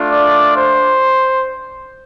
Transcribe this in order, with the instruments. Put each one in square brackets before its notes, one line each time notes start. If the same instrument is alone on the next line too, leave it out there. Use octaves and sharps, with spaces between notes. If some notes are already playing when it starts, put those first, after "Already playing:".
Already playing: [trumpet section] A3 D4 F4
D5
C5